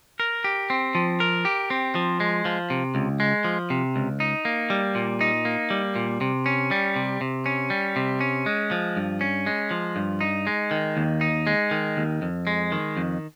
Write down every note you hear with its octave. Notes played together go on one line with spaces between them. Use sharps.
A#4
G4
C4
F3
A#4
G4
C4
F3
G#3
F3
C3
C#2
G#3
F3
C3
C#2
D#4
A#3
G3
A#2
D#4
A#3
G3
A#2
C3
C#4
G3
C3
C3
C#4
G3
C3
C#4
G#3
F3
G2
C#4
G#3
F3
G2
D#4
G#3
D#3
D#2
D#4
G#3
D#3
D#2
F2
G#3
D#3
F2